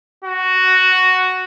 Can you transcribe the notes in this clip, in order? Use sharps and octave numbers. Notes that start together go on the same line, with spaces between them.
F#4